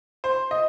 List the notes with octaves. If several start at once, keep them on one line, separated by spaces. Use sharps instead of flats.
C5
D#5